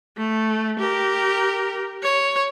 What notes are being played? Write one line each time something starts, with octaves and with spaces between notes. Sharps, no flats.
A3
G4 A#4
C#5